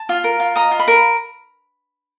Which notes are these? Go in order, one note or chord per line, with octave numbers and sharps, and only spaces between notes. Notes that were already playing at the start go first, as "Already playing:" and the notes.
Already playing: A5
F4
A#4
F4
D#5 A#5
F4
B5
A#4